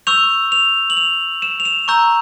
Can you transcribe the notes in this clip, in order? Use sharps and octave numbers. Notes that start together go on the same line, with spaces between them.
C#6 E6 G6 F7
F7
F#7
F7
E7
F7
E7
A#5 C#6 E6 G6